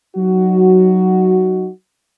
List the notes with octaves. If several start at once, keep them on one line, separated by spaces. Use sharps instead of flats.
F#3 D#4 F#4